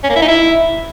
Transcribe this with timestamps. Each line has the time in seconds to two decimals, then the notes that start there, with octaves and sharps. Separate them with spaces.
0.04 C#4
0.10 A#3
0.16 E4
0.22 D#4
0.28 E4